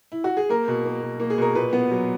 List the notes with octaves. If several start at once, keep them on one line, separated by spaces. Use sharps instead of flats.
E4
F#4
G#4
A#3 A#4
B2
A#3
B2
A#3
G#4
B2 A#4
A#2 B4
B3
F#3